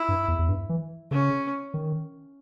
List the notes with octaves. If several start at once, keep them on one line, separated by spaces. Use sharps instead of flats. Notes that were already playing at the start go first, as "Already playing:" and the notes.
Already playing: E4
G2
E2
E2
G2
E3
C#3 C#4
D#3